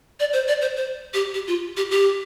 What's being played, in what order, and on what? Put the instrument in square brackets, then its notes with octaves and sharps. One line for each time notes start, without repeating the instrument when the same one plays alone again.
[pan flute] D5
C5
D5
C5
C5
G4
G4
F4
G4
G4